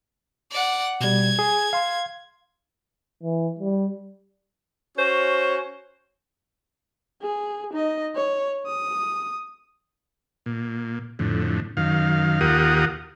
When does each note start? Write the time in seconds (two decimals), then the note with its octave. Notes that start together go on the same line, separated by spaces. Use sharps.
0.51 D5 F#5
1.01 B2 G3 G#6
1.39 G#4
1.73 F5 C6
3.23 E3
3.59 G3
4.98 C#4 F#4 C5 C#5
7.22 G#4
7.73 D#4 D#5
8.15 C#5
8.67 D#6
10.46 A#2
11.19 F2 A2 D3
11.77 F#2 D#3 F5
12.41 D#2 F4 G4 A#4 F#5 D#6